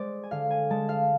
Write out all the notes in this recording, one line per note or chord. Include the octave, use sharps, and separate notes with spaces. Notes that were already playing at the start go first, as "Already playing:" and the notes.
Already playing: G#3 C5 D5
G#5
D3 F5
G#5
G#3 A5
F5